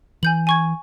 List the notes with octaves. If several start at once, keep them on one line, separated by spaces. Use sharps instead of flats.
E3 G#5 G6 F#7
G#5 C#6 G#6